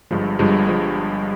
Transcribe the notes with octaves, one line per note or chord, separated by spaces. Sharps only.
G1 G2 F3 G#3
G1 G2 F3 G#3
F3 G#3